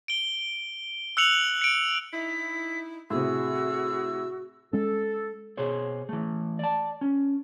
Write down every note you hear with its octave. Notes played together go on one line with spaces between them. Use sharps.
D7 G7
E6 F#6 C#7 F7 F#7
C#7 D7
D#4 E4 B6
A2 C3 F#4 G#4 E6
G#3 C#4 A4
B2 G#4 C5 C#5
E3 A3
D5 A5
C#4